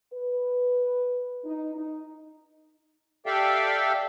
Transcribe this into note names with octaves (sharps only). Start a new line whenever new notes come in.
B4
D#4
D#4
G4 A4 D5 E5 F5 G5